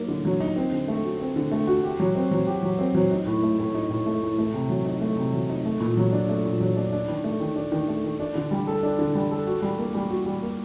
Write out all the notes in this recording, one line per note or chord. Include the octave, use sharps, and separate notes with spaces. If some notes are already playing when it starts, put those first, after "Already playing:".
Already playing: F#3 A#3 D#4
D3
F#3
D#4
C4
D3
A3
F#4
C4
D3
A3
F#4
G4
F#3
C4
F#3
G4
F#3
C4
F#3
D#4
A2
A3
A2
D#4
A2
A3
A2
A3
C3
F#3
D#4
A3
C3
F#3
D#4
A3
A#2
F#3
D4
A3
A#2
F#3
D4
D4
D#3
A3
D#3
D4
D#3
A3
D#3
D4
D3
G3
A4
D4
D3
G3
A4
F#4
G3
A#3
G3
F#4
G3
A#3